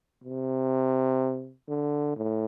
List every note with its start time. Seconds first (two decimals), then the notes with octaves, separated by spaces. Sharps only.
0.24 C3
1.68 D3
2.16 A2